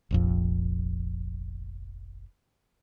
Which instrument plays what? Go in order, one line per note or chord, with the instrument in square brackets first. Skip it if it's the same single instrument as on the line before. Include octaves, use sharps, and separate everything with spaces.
[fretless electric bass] F1 A#1 F2